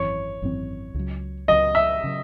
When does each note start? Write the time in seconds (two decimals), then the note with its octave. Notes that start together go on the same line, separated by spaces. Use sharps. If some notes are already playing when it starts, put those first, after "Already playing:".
Already playing: G#1 F#2 E3 C4 C#5
0.42 G#1 F#2 E3 C4
0.95 C#2 C#3 F#3
1.48 C#2 C#3 F#3 D#5
1.75 E5
2.04 C#3 F#3